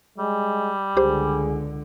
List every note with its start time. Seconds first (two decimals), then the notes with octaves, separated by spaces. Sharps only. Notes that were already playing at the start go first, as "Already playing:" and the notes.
0.18 G3 G#3
0.97 C#2 D3 G4 G#4 C5